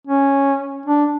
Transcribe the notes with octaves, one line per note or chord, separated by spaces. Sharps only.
C#4
D4